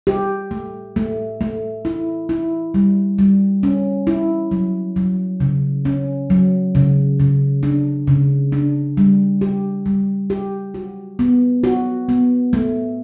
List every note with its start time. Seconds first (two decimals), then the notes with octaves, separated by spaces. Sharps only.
0.07 G4
0.51 A3
0.96 A3
1.41 A3
1.85 E4
2.29 E4
2.74 G3
3.19 G3
3.63 C#4
4.07 E4
4.51 F#3
4.96 F#3
5.40 C#3
5.85 C#4
6.30 F#3
6.75 C#3
7.20 C#3
7.63 D4
8.07 C#3
8.52 D4
8.97 G3
9.41 G4
9.86 G3
10.30 G4
10.74 F#4
11.19 B3
11.64 F#4
12.09 B3
12.53 A3